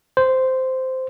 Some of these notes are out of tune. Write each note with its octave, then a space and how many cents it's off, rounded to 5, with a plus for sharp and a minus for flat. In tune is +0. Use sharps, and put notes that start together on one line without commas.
C5 -10